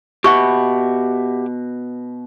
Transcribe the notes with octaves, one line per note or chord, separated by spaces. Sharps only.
B2 G4 E5 F#5 C#6